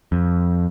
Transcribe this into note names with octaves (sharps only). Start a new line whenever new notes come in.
F2